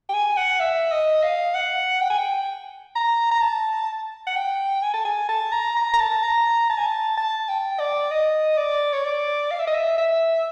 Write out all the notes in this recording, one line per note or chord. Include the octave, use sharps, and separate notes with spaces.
G5
G#5
F#5
E5
D#5
F5
F#5
G5
G#5
G5
A#5
A#5
A5
F#5
G5
G#5
A5
G#5
A5
A#5
A#5
A#5
A5
A#5
A5
G#5
A5
A5
G5
D5
D#5
D5
C#5
D5
F5
E5
D#5
E5
E5